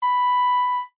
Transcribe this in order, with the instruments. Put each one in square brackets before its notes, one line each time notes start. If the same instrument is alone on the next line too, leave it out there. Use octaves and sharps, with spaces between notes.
[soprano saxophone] B5